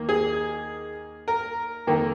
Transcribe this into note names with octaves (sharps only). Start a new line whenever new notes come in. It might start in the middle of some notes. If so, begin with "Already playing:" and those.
Already playing: D#2 A#3
G#4
A#4
F2 D#3 A#3